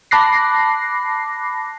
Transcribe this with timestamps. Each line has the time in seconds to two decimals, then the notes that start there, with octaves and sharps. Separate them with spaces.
0.11 A5 B5 D6 F#6 A#6 C7